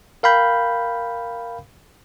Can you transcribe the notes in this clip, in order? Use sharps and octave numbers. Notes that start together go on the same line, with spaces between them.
A#4 F5 G5 B5 G6